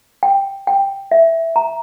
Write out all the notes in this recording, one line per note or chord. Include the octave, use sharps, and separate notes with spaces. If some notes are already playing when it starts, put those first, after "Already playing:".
G5
G5
E5
A#5